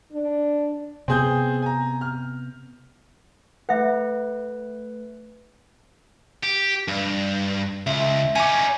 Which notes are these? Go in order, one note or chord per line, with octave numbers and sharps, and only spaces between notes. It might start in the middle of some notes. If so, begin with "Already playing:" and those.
D4
C3 B3 C4 G#4 G6
G#5 A#5
F6
A3 B4 E5 F#5
G4
G2
C#2 E5
C#4 D#4 G#5 D6